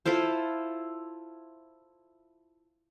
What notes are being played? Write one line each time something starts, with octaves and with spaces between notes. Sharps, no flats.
E4 F4 A4 C5